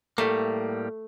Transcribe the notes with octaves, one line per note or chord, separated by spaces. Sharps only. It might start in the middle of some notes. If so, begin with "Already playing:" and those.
A2 G3 A3 A#3